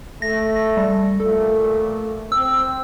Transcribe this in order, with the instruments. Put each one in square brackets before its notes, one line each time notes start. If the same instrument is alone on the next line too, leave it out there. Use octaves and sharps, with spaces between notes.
[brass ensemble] A3 [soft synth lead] A#6
[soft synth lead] G3
[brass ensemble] A#2 A3 [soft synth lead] A4
[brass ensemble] C4 [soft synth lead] E6